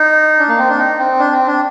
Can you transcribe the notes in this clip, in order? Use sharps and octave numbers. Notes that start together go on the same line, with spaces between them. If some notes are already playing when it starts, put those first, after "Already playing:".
Already playing: D#4
D4
A#3
C4
D4
D#4
C4
D4
C4
D4